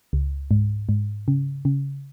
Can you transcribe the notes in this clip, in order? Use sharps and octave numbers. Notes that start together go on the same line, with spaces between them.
C#2
G#2
G#2
C#3
C#3